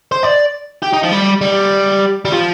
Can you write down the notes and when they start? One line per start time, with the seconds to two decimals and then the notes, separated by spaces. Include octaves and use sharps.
0.12 C5
0.23 D5
0.82 G4
0.93 D#4
1.03 F3
1.12 G3
1.41 G3
2.25 G3
2.32 F3